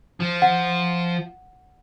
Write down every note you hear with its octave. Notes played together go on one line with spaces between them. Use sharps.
F3
F#5